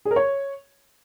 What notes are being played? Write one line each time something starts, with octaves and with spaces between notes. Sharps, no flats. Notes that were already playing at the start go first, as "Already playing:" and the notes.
G#4
A#4
C#5